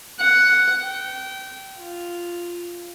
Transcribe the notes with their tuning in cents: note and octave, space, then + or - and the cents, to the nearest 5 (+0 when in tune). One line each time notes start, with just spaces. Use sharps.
F#5 +5
G5 -25
F4 -5